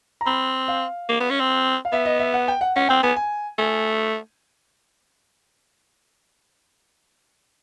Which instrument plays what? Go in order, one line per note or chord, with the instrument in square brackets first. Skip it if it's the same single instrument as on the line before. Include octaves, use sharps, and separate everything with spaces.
[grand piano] A#5
[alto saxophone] C4 [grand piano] B5
[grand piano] F5
[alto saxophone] A#3
B3
C#4
C4
[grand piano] F5
[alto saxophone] B3 [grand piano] E5
[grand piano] D#5
E5
F#5
G5
F#5
[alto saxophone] C#4 [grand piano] F#5
[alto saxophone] C4 [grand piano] G5
[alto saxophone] B3 [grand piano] G#5
[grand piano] G#5
[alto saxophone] A3 [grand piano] G#5